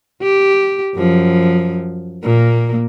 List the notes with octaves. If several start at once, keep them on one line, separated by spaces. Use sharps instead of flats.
G4
F#2 F3
A#2 A#3